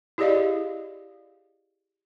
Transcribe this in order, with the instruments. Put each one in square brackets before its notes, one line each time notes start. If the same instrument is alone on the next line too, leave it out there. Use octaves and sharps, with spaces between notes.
[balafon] E4 G4 G#4 D5 D#5 F5